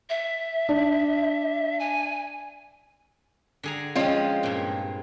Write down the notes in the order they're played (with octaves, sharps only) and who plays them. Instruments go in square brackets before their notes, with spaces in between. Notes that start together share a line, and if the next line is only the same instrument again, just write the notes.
[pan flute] E5
[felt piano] D4
[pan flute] G#5
[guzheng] D3 G#4 A#5
[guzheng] F3 C4 [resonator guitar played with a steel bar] G#3 C#4 F4
[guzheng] G2 A#2